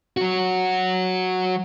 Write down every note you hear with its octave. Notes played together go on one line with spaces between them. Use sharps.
F#3 F#4